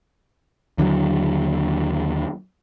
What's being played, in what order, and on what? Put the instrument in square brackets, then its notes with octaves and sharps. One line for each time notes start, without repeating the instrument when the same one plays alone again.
[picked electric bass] D#2 D3 D#3 F#3